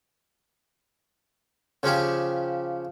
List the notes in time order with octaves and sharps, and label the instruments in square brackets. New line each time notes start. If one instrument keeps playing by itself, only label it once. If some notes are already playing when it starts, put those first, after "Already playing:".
[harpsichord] C#3 F3 C#4 G4